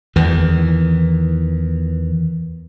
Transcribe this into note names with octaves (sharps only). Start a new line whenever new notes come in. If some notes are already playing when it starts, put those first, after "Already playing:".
E2 D#3 E3